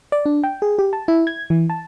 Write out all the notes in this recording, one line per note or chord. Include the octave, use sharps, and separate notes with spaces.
D5
D4
G5
G#4
G4
A5
E4
G#6
E3
A5